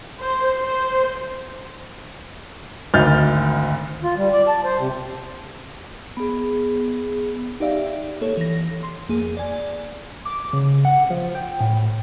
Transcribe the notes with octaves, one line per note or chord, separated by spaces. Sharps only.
C5
C5
G#1 D2 D#5 F6 G6 A6
F4
G3
D5
A5
C5
C3
B3 G#4
D#4 G4 D5 E5 F5 G5
A#3 A4 C#5
E3 A#6
C6
F2 A#3 G#4
D5 G#5
D6
C#3
F#5
F3
G5
A2